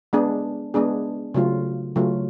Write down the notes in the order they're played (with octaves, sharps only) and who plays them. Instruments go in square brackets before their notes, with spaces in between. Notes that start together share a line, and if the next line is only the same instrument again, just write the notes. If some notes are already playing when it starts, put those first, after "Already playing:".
[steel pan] G#3 B3 D4 G#4
G#3 B3 D4 G#4
C#3 F#3 A3 F4
C#3 F#3 A3 F4